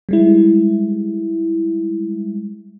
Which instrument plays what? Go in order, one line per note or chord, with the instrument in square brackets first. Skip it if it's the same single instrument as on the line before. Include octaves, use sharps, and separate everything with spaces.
[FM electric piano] G3 G#3 E4